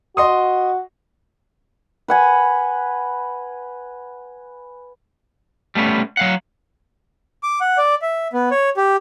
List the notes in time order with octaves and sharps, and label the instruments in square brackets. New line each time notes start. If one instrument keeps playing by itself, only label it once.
[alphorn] F#4 [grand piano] D#5 C6 D#6
[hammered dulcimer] B4 F#5 G#5
[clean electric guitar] G3 A3 B3 C#4
F#3 F5 F#5
[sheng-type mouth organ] D6
F#5
D5
E5
B3
C#5
G4